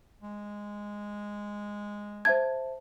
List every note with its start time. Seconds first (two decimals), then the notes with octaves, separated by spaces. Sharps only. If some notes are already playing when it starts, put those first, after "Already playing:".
0.23 G#3
2.25 C5 E5 A5 G#6